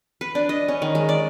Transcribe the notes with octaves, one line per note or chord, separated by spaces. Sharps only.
B4
D4
D#5
C#4
D#3
G#3
D5